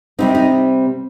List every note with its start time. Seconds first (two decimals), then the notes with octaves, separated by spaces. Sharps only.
0.19 C3 G3 C4 D#4
0.35 D#4